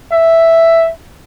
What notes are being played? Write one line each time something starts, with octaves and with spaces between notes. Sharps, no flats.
E5